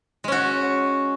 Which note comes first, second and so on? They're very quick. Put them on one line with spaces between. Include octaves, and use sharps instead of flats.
G#3 C#4 F#4